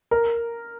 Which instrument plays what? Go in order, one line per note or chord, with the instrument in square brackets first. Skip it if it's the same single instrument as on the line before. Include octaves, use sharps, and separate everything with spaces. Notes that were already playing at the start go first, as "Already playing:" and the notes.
[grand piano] A#4